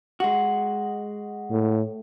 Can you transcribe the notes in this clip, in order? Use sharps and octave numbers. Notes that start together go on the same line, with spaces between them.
G#3 F#4
A2